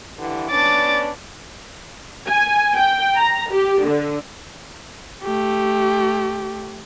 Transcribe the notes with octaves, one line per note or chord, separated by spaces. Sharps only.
G2 D3 E3
B3 C#4 D4 D6 A6
G#5
G5
A#5
G4
D3
A3 G4